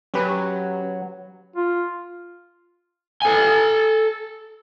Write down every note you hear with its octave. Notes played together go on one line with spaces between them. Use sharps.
F#3 C#4 G4 B4
F4
A4 G#5